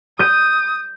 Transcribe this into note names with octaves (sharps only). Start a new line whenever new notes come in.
D#6 G6 D#7